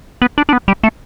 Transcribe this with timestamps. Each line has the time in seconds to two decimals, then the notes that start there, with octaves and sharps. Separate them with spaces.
0.22 B3
0.38 D4
0.49 D4
0.53 B3
0.68 G3
0.84 A3